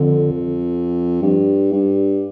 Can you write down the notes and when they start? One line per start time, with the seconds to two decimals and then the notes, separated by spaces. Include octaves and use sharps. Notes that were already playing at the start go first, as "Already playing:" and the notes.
Already playing: F2 D3
1.22 G2
1.73 G2